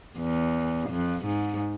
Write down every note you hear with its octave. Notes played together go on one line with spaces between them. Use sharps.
E2
F2
G#2